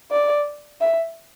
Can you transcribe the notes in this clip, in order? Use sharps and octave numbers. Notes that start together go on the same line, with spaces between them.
D5
E5